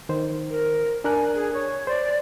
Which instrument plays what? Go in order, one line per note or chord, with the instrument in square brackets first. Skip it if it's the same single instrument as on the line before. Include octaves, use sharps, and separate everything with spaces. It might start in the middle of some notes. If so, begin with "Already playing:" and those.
[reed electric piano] D#3 C5
[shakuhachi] A#4
[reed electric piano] D4 A#4 F#6 [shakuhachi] G#5
[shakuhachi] G#4
C#5
[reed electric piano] C5 [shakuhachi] D5